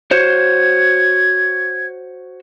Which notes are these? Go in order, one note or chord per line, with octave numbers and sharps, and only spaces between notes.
F#4 C5 C#5 G#6